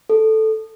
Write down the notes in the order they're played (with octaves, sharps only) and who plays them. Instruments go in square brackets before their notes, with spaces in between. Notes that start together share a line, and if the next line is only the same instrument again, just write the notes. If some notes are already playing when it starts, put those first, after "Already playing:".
[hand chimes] A4